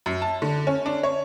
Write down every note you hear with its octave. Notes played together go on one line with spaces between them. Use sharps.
F#2
A5
D3
C#4
D4
C#5